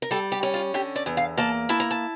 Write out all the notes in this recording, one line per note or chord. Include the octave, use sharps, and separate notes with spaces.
A#4
G3 A4
G4
C#4
F4
D3 G4
D5
E2
F5
A#3 A5
E4 A5
A#5
A5